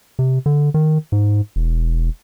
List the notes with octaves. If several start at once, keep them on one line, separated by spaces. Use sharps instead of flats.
C3
D3
D#3
G#2
E1